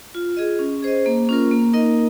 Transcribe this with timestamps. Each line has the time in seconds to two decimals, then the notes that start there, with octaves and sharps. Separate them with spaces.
0.15 F4
0.37 G#4 D#5
0.59 C#4
0.82 G#4 C5 D#5
1.06 A#3
1.29 C#4 F4 A#4
1.51 A#3
1.73 D#4 A#4 D#5